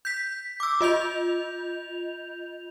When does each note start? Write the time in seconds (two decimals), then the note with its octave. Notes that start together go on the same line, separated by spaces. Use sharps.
0.05 G6 B6
0.60 D6 E6
0.81 F4 D#5 G6 F7